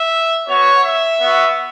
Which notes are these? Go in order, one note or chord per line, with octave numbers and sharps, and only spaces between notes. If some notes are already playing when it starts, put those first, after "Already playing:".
Already playing: E5
B3 F#4 C#5
E5
B3 F#4